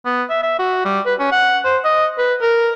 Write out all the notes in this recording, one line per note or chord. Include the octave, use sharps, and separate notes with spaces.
B3
E5
E5
F#4
G3
B4
C#4
F#5
C5
D#5
B4
A#4